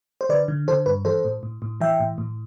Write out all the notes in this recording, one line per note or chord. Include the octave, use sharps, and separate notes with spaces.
C5
D3 B4 D5
D3
D3 A4 C5
G2 B4
E3 A4 C5
A2
A2
A2
E3 E5 G5
A2
A2